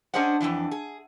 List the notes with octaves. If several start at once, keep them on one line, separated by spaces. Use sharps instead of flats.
C#4 D4 G#4 C5 D#5 F#5
F2 G#2 E3 D4
G#4